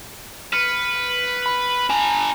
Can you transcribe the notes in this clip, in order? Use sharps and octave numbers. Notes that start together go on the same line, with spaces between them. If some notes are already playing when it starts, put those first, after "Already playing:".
B4 F6 C#7
B5 F#7
D4 G#5 A#5